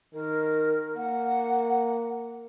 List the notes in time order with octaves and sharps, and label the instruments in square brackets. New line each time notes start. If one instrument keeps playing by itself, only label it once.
[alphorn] D#3 [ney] A#4
[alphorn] A#3 [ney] F#5